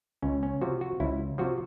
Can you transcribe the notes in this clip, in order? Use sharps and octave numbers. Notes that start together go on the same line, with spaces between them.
C#2 C#4
C#4
C3 F3 F#4
F#4
C#2 E4
C3 F3 F#4